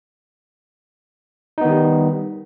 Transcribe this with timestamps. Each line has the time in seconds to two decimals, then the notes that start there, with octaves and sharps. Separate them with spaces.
1.58 D#4
1.61 B3
1.65 D#3
1.69 G3